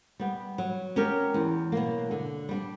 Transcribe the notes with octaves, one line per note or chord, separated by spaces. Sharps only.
G3 B3
F#3
C#4 G4 A#4
E2
B2 F#3 A#3
D3
G3 B3 D4